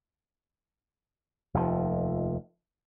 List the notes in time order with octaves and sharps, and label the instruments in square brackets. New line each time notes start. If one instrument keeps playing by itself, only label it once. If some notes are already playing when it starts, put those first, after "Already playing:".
[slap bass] F1 D#2 F3